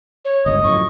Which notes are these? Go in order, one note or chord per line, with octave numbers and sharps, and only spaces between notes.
C#5
G1 C#2 G2 D#5
F#2 A2 F3 C#6